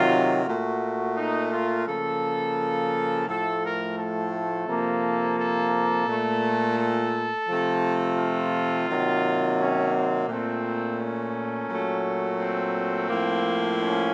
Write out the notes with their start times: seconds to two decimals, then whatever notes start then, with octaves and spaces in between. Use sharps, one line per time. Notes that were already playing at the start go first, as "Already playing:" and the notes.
Already playing: C3 D#3 F#3 F4
0.46 A#2 A3 F#4
1.16 D#4
1.52 F4
1.86 C#3 F3 A#3 A4
3.27 A2 F3 A3 A4
3.63 A#4
3.97 A4
4.67 C3 F3 A#3
5.37 A4
6.07 A#2 A3
6.77 A4
7.48 C3 F3 A3
8.18 F4
8.88 C3 D#3 F#3 A#3
9.58 C#4
9.94 C4
10.28 A#2 A3 C4
10.98 C#4
11.69 A#2 F#3 A3
12.38 C4
13.08 A2 F3 A#3
13.80 C#4